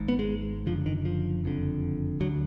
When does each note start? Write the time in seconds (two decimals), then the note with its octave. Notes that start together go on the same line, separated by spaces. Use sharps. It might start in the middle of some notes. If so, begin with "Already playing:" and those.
Already playing: G#1 G#2
0.08 B3
0.19 G#3
0.66 F#1 F#2 D3 F3
0.86 D#3
1.05 F3
1.44 F#1 F2 D3
2.20 D2 D3 F#3